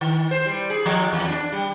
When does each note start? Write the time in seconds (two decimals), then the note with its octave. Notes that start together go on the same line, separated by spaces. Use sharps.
0.01 D#3
0.31 C5
0.46 G3
0.70 G#4
0.86 F3
1.13 E2
1.28 D4
1.52 G3